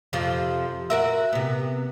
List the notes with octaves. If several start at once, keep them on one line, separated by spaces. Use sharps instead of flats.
F2 C3 F3
F#4 A#4 E5
C3 B3